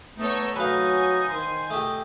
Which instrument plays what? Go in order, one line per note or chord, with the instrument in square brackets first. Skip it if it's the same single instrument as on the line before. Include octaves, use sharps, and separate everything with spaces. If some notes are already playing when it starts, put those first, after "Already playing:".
[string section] A3 A4 C#5 [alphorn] B3 [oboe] D#4
[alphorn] F#3 [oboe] D#4 [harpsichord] B4 F5 [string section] G#5
[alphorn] D#3 [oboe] C5
[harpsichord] A3 G4 [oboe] D#5